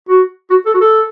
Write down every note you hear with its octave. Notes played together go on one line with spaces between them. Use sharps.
F#4
F#4
A4
F#4
A4